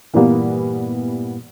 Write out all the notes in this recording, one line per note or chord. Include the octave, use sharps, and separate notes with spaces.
G2 A#2 E3 G3 A#3 B3